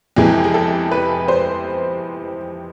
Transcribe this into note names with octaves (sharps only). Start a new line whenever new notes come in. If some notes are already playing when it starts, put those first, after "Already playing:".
F2 C3 E3 G#3 G#4
G#4
A4
B4
C5